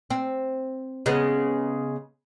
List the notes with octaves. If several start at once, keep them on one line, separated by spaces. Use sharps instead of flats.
C4
C#3 G#3 B3